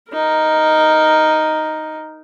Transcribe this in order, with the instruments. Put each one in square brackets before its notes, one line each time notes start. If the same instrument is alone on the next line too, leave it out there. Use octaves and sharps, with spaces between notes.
[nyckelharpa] D#4 A#4